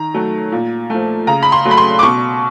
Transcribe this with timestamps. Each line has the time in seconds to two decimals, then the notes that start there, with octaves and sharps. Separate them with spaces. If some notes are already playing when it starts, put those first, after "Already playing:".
Already playing: D#3 A#5
0.14 F#3 A3
0.52 A#2
0.90 F3 A3
1.27 C#3 A#5
1.42 B5
1.52 C6
1.65 F#3 A3
1.71 B5
1.77 C6
1.99 D6
2.03 B2 C#6